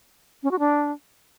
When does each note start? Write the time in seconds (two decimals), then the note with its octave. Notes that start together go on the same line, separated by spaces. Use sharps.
0.43 C#4
0.51 F#4
0.59 D4